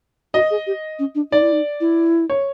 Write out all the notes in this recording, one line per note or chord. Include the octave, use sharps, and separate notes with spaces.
F#4 D#5
G#4
G4
C#4
D4
D#4 D5
E4
D#4
E4
C#5